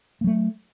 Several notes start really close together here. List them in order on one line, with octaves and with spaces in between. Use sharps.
A#3 F#3 A3